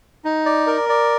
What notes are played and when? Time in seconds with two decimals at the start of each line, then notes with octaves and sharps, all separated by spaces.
0.25 D#4
0.46 D5
0.67 A#4
0.89 D5